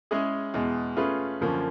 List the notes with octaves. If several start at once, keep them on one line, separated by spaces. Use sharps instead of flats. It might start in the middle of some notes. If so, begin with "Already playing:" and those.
G#3 C#4 E4 G#4
E2 B2 G#3
A3 C#4 F4 G#4 B4
F#2 D3 F3 A#3 C#4